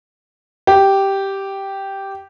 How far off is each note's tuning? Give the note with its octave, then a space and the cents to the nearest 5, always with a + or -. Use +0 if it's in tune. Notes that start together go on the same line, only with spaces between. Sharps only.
G4 -5